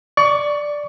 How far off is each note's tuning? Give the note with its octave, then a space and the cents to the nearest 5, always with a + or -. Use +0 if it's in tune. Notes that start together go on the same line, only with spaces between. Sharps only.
D5 +0 C#6 +20